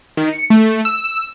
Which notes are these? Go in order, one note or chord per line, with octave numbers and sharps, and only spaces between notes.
D#3
C#7
A3
E6